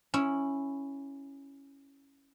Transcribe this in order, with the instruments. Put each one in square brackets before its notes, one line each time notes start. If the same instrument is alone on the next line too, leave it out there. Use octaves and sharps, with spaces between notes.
[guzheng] C#4 E4